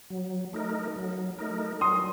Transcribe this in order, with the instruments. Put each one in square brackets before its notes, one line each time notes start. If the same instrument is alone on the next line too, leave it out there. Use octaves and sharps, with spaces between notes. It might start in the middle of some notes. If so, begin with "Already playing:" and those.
[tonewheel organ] F#3
A3 D#4 A#4
F#3
A3 D#4 A#4
[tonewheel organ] F#3 [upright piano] C6 D#6